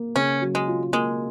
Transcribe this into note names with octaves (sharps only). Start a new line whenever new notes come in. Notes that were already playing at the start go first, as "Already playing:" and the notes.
Already playing: A#3
C#3 C#4
F#3
G#3
F4
G#3 A#3